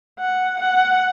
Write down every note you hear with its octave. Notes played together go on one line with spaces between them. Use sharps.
F#5
F#5